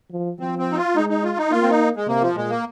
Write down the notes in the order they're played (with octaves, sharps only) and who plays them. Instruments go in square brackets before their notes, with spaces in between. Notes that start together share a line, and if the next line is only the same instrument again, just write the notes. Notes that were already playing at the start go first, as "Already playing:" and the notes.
[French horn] F3
[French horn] F3 [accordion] C4
[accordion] C4
D#4
F4
[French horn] G#3 [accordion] D#4
[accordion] D#4
F4
D#4
[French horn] A#3 [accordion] F4
[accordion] C4
D#4
G#3
[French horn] C3 [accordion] A#3
[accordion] F3
[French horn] A#2 [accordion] G#3
[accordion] A#3